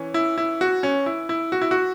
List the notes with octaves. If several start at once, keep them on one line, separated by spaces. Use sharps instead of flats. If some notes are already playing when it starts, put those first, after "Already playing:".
Already playing: E3 C#4
E4
E4
F#4
C#4
E4
E4
F#4
E4
F#4